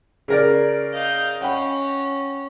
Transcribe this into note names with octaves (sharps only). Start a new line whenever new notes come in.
C#3 A#4 D5
D#5 F5 G6
C#4 F#5 G5 B5